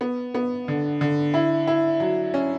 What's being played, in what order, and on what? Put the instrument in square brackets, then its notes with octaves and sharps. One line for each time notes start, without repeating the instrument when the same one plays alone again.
[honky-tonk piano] B3
B3
D3
D3
E4
E4
F#3
C#4